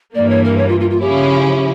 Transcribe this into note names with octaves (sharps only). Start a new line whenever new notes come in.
G2 E3 A#3 D5
C#5
A#4
C#5
F4
F4
F4
C#3 F3 C#4 E4 G4